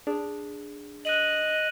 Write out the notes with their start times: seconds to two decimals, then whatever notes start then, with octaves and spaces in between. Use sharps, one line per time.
0.07 D4 G#4
1.05 D#5 F#6 D#7 F#7